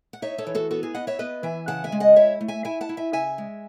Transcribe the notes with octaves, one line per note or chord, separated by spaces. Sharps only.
F#5
D#4 C#5 E5
A4 C#5
E3
F#4 A4
B3 F#4 A4
G#4
B3 D#5 F#5
C#5 E5
B3 B4 D#5
E3 E5 G#5
C#3 F#5 A5
E5 G#5
G#3
D#5 F#5
E4 C#5 E5
A3
E5 G#5
E4 E5 G#5
F#5 A5
E4
E5 G#5
C#3 E5 G#5
G#3